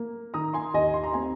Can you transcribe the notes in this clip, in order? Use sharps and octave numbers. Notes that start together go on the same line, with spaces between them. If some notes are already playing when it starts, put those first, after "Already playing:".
Already playing: A#3
D#3 A#5 D#6
G#5 C6
D#2 D#5 G#5
C6
A#5
C4 G#5